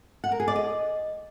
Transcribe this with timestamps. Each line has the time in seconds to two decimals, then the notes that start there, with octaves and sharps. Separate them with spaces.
0.24 F#5
0.32 A#4
0.40 G#4
0.48 D5
0.56 D#5